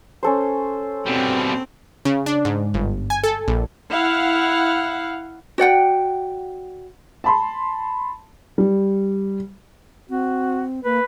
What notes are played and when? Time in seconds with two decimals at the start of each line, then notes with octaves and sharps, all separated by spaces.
0.23 C#4 A4 C5
1.06 B2 G3 C4
2.05 C#3
2.26 D4
2.45 G#2
2.74 G1
3.10 G#5
3.24 A4
3.48 A#1
3.91 E4 F5 F#5
5.58 F#4 D5 F#5 G5
7.24 A5 B5 C6
8.58 G3
10.10 C4 F#4
10.85 A#3 B4